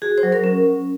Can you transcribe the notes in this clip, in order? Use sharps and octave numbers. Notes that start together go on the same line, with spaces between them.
F#4 G#4
C5
F#3
A#4
C#4